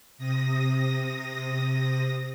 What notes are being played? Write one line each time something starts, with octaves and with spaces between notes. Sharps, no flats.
C3 D#6 A#6